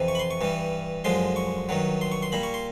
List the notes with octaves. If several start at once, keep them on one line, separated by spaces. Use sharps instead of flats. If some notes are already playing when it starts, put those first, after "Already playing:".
Already playing: F2 C3 E3
C#6
B5
C6
C#6
G2 E3 G3
F#2 D3 F3 G#3 C6
C#6
G2 D#3 F#3
C6
C#6
C6
A#2 G3 B5
C#6
C6